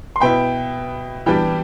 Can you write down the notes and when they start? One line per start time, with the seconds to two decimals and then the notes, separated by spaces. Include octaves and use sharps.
0.16 C6
0.20 B2 B3 E4 G5 B5
1.26 E3 G3 B3 D4 G4 G5 B5